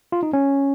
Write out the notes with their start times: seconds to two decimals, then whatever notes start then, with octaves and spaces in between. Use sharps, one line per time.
0.12 F4
0.23 D#4
0.33 C#4